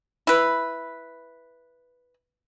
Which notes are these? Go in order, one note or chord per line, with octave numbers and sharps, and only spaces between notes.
E4 B4